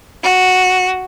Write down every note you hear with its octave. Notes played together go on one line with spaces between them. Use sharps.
F#4